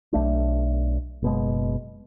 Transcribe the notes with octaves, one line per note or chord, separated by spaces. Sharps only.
B1 A3 D4
F#1 B2 G#3